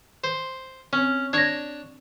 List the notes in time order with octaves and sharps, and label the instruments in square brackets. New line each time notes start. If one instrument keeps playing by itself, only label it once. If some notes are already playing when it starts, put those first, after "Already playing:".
[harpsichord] C5
[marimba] C4 [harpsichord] C#4
[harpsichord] D4 C#5 [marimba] G#6 A#6